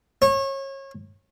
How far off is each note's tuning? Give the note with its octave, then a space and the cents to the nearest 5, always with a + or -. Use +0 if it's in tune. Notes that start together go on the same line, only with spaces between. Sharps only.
C#5 -30